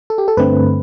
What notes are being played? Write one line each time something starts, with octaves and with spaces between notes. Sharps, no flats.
A4
G4
A4
G2 D3 A3 C4 B4